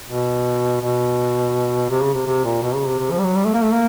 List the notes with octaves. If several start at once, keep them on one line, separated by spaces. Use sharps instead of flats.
B2
B2
C3
C#3
C3
C3
A#2
B2
C#3
C3
C3
F3
G3
F#3
G3
A3
A#3
A3
A#3